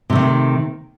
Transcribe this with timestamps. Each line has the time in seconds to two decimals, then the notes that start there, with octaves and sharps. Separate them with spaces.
0.10 C3
0.13 A3
0.15 D#3